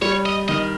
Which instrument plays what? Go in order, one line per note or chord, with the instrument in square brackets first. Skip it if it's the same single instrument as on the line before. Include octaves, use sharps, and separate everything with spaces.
[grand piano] G3 [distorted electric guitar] C#5
[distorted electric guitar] D#5
[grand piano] D#3 [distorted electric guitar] D#5